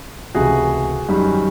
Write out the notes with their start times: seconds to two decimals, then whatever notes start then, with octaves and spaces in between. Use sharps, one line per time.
0.34 C#2 C3 E3 A3 F#4 G#4
1.08 F#2 D#3 G3